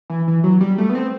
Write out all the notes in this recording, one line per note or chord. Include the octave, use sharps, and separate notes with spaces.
E3
E3
F#3
G3
A3
B3
C4